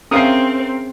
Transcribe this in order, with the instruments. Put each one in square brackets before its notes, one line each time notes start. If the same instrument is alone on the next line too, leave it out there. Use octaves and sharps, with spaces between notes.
[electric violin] C4 [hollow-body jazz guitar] C#4 G#4 E5 [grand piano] A#4 C7 [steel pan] F5 D#6